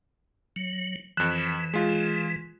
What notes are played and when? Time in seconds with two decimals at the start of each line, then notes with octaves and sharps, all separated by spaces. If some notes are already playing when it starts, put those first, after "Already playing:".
0.56 F#3
1.17 F2 E3 F#6
1.74 G#3 F4